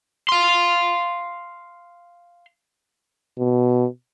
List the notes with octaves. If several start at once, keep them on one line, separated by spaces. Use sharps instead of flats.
F5 C6
B2